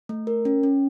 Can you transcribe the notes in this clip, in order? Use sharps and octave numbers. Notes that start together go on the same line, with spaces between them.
A3
A#4
C#4
C#4